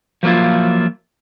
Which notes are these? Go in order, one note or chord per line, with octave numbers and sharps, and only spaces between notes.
F3 F#3 A#3 E4 F4